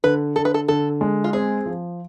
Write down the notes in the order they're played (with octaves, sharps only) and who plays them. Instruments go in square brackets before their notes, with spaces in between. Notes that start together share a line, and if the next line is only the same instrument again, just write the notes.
[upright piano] D3 [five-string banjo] B4
[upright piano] D3 [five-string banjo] A4
[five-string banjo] B4
A4
[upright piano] D3 [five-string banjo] A4
[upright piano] G#3
[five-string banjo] F4
[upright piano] C4 [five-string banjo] G#4
[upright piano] F3